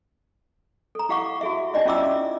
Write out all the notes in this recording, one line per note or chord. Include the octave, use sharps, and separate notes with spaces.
A4 A#5
E4 G4 F5 F#5 C#6 D6
F#4 G#4 E5
D4 D#4 D5 D#5
C#4 E4 F4 E5 D6 E6